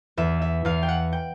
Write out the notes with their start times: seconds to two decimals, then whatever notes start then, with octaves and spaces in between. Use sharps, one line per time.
0.17 E2 E5
0.42 E5
0.65 E2 F5
0.83 G5
0.88 F#5
1.13 G5